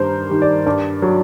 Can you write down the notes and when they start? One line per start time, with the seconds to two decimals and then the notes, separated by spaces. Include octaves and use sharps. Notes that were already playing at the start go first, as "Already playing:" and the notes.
Already playing: G2 D#3 G3 A#4 C5
0.29 D#3 G3
0.42 D5
0.66 G2 D5
1.02 F#3